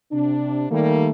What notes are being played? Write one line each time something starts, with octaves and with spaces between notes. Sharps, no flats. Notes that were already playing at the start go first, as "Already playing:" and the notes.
C3 D4
D#3 G3 A3 A#3